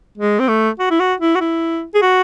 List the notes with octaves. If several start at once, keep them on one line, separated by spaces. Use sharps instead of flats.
G#3
C4
A3
F#4
E4
F#4
E4
F#4
E4
G#4
F#4